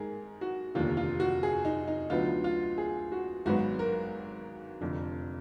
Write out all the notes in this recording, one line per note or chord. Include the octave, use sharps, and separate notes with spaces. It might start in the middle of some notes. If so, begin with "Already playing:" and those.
Already playing: G#2 D#3 G#4 A#4
F#4
F1 D#2 D3 F4
F4
F#4
G#4
D#4
D#4
D2 D3 F#3 B3 F4
F4
G#4
F#4
G#1 G#2 F#3 B3 F#4
A#4
F1 F2 D3